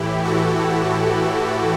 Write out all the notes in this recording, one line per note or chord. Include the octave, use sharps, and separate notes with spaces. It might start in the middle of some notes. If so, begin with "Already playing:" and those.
Already playing: A2 E3 E4 G4
F#4 A4